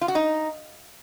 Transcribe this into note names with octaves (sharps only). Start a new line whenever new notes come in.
F4
F#4
D#4